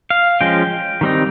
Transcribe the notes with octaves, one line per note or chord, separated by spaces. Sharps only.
F5
F3 G#3 C#4 G5
D#3 G3 C4 D#4